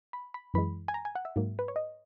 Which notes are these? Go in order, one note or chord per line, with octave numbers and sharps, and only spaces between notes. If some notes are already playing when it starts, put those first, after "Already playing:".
B5
B5
F#2 E3 G#3 B5
G#5
A#5
G#5
F#5
E5
G#2 F#3 A#3
B4
C#5
D#5